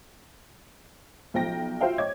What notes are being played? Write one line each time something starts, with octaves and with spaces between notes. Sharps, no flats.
B1 F3 G5 A#6
F4 F#4 C5 E5 F5 G5
C#5 D#5 D6 G#6